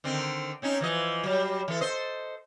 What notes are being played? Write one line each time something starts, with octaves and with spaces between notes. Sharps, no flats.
D3 D#3 C4
C4 C#4 D#4
E3 F3 D#5
F#3 G3
E3 A4
A4 C5 D#5